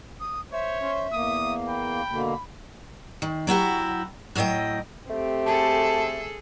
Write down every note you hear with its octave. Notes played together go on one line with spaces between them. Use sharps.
D#6
C5 C#5 E5
C#4 C5
E2 A#3 D#6
G5 B5
B2 D3 A#3
D#3
F#3 E4 F#4 G4
A2 F#3 E4 D#5 G5
A3 C4 G4
G#4 A4 A5